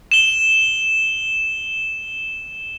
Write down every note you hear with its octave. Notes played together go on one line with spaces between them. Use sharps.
E7 G7